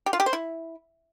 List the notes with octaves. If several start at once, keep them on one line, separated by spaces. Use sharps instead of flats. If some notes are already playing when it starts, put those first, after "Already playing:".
G4
F4
G4
C5
E4